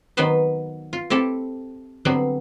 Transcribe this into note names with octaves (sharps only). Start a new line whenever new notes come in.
D#3 F#3 B3 B4 C5
F4
C4 E4 G4 A4
D3 F#3 G3 B3 C4